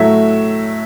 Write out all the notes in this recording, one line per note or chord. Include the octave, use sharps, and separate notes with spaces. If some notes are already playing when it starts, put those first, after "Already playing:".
Already playing: A2 F#3 A3 E5